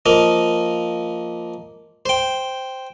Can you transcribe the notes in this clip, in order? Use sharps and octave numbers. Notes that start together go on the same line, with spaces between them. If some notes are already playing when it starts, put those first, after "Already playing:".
F3 A#3 D#5
C5 G5